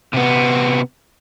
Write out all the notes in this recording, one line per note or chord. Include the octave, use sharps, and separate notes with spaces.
C3 B3